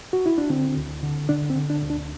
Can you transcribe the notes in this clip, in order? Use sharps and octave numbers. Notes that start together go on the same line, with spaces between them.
F#4
E4
D4
D3 C4
D2
D3
D3 D4
C4
D3
D4
D2
D4